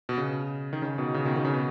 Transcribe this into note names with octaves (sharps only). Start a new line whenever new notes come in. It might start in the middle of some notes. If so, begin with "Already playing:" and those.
B2
C#3
D#3
C#3
B2 D#3
C#3
B2 D#3
D#3
C#3
B2